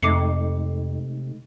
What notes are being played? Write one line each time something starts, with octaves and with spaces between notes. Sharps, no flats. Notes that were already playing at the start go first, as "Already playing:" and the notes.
F2 C3 G#3 A3 D#4 D6 C7 C#7